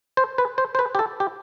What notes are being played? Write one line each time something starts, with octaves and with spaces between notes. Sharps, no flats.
C5
B4
C5
C5
B4
G4
A4
G4